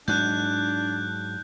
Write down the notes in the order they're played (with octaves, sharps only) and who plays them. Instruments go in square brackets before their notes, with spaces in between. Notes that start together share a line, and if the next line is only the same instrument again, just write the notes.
[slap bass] G#2 F#3 [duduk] D4 [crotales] F#6 G6